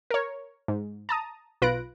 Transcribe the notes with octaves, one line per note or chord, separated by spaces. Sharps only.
A#4 C#5
G#2
A5 A#5 D#6
B1 F4 B4 F#6 A#6 D7